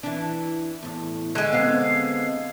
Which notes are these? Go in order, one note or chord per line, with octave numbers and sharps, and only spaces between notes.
E3 D4
E2 A2
D3 G#3
B3 C4 G4 F5